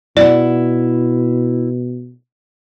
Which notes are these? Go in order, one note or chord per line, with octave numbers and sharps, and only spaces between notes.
B2 E4 D5 F#5